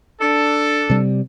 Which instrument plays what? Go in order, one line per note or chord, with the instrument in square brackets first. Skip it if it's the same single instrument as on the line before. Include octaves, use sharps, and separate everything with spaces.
[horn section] D4 A4
[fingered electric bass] C3 G3